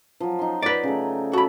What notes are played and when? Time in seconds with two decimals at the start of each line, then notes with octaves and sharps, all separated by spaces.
0.20 F3 F#3
0.39 D#4 C6
0.63 B4 D5
0.83 C#3 A3
1.33 F#4 A4 B5